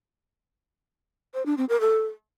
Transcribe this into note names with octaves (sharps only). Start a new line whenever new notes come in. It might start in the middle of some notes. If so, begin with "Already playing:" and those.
C5
D4
C4
A#4
A4